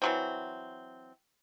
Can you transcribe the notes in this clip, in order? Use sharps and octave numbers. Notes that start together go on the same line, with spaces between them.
E3 F#3 C4